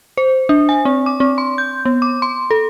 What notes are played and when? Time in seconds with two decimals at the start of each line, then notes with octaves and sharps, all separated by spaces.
0.17 C5
0.49 D4
0.69 G#5
0.85 C4
1.06 D6
1.20 C4
1.38 C6
1.58 G6
1.85 B3
2.02 D6
2.22 C6
2.51 A4